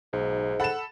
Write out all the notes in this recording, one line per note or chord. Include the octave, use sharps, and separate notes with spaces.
B1 G#2
A4 F#5 B5 A6 E7